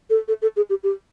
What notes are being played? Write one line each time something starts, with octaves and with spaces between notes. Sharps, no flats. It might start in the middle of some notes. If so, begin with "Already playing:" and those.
A4
A4
A4
G#4
G4
G4